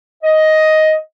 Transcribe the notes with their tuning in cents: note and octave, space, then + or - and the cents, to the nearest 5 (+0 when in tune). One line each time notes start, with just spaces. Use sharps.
D#5 +5